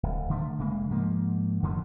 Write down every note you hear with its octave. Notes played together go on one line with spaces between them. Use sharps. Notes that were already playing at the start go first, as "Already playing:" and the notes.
D1
D3 D#3 A3
F1 C#3 G#3 A#3
G#2 F3 A#3
F2 D3 E3 F3